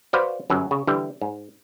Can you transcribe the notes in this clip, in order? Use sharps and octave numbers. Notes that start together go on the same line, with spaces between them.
F#4 B4 C5 D5 F5
G1 F#2 F#3
C#3
D3 E3 G3
G#2